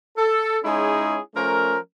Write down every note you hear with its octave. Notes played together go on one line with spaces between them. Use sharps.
A4
G#3 C#4 D#4 E4 G#4 C#5
F3 A3 C#4 A#4